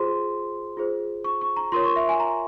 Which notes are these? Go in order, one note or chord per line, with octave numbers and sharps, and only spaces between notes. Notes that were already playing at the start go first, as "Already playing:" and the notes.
Already playing: F4 G#4 C5 C6
F4 G#4 C5
C#6
C#6
A#5
F4 A#4 C#5 C6
C#6
E5
G#5
A#5